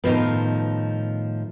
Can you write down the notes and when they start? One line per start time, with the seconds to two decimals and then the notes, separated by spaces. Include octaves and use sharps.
0.04 A2 D#3 F3 B3